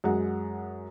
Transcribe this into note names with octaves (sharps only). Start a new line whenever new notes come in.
F#2 G#3 F#5